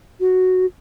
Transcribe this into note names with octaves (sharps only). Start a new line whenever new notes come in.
F#4